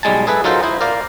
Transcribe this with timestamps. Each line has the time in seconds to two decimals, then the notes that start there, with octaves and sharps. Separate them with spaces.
0.03 B1 G3 G#3 G#5 A5
0.27 G#4 A4 B4 E5
0.44 F#3 D#4 F4 A4 A#4 C5
0.63 E4 C5
0.81 A#4 D5 F5